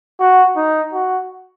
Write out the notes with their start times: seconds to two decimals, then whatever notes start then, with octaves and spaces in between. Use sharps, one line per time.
0.20 F#4
0.56 D#4
0.93 F#4